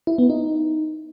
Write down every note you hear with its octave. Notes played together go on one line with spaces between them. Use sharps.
E4
B3
D#4